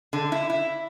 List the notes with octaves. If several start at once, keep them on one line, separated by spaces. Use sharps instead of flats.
D3
E4
E4